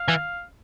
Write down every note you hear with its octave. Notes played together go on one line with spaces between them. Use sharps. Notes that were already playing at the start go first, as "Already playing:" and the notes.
Already playing: F5
E3